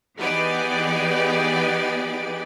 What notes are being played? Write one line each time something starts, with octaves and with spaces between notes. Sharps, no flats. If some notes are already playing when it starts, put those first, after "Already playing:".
E3 B3 D#4 G4 G#4 D5